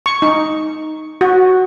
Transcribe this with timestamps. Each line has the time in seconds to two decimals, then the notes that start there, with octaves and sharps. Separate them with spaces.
0.06 C#6
0.22 D#4
1.21 F#4